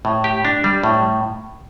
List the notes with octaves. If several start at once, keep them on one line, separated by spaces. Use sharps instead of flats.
A2
G4
D4
G3
A2